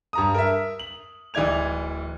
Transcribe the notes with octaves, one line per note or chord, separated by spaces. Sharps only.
G2 A#5 D#6
A#4 E5
F#7
D1 E3 D#4 D5 G#6 F7